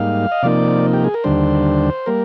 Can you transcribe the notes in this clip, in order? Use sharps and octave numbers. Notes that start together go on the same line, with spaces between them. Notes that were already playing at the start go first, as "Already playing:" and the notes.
Already playing: G#2 G3 A#3 D#4 F5
D#5
C3 F3 A#3 D#4 D5
G4
G#4
A#4
D#2 D3 G3 D4 C5
G3 A#3 A#4